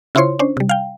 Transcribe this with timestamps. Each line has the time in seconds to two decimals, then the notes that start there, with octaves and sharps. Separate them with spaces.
0.15 C#3 E4 F4 C5 C#5 C6
0.39 C#4 D4 C5
0.57 C3 G3
0.69 F5 G5